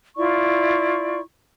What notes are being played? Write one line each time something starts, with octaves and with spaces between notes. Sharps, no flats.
E4 F4 D5 C#6